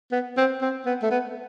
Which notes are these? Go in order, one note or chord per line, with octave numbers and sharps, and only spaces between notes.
B3
C4
C4
B3
A3
B3